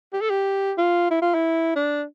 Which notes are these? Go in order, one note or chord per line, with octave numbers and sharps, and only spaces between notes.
G4
A4
G4
F4
E4
F4
E4
D4